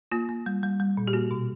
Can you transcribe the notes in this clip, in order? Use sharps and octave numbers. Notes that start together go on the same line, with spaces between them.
A#3 F4
A#3
G3
G3
G3
A#2
G4
A#3 F#4
B2